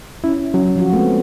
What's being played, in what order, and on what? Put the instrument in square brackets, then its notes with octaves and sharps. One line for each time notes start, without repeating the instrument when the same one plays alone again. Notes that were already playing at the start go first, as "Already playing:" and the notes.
[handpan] C#4 [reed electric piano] E4
[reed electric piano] F#3 [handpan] C#4
[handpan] F3 F4 F#4
[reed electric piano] G#3 [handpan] A3 B3 C4